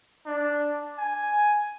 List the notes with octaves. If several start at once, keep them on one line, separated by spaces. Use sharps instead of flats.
D4
G#5